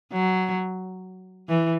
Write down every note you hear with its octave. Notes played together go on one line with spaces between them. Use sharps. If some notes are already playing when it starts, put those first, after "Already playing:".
F#3
E3